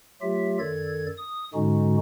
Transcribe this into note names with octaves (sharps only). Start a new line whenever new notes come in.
F#3 A3 F4 G4 E5
F#2 D#3 A4 D5 G#6
D#6
G#2 D3 G#3 C#4 D#4 F#4